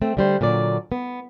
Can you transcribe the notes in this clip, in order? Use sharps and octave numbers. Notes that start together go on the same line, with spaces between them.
A3 C4
D3 G3 C5
A#2 D3 F#3 D5
B3